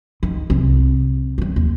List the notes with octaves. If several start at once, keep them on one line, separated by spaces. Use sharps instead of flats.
D#3
C2
F#3 G3
D#2